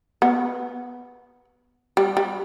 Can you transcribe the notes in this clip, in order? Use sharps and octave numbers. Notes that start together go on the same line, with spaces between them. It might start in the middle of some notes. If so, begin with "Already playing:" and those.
B3
G3
G3